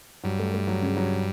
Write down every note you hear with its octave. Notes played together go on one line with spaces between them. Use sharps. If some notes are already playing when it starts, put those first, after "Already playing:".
G2 F#3
A3
A3
F#3
C#3
F#3